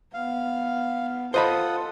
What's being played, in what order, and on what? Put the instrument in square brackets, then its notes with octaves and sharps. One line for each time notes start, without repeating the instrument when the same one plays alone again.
[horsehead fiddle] B3 [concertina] F5
[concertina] F4 F#5 D#6 [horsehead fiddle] A4 [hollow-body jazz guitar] C5 D#5 B5